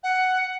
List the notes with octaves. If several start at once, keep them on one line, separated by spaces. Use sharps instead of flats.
F#5